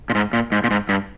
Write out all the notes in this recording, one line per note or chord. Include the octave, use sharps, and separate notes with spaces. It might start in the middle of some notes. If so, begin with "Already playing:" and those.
A#2
G#2
A#2
G#2
A#2
G#2
G2